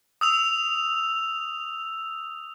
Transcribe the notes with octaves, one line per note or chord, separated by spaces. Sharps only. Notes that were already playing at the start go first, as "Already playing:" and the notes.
D#6 E6 F7